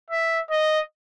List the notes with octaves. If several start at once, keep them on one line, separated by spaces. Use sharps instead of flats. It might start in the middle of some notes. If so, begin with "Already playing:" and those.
E5
D#5